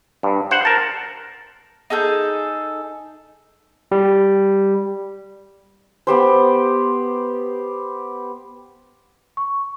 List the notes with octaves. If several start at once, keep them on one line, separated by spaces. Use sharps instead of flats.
G2
C5 F#5
A#4 A5
D#4 G#4 A4 G6
G3
B3 G4 C5
C#6